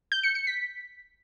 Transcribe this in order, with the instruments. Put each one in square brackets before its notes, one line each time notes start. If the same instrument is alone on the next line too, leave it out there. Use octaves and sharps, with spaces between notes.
[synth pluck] G6
C#7
C#7
B6